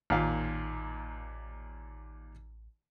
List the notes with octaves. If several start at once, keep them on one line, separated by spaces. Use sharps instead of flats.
A1 D#2 A#2 F5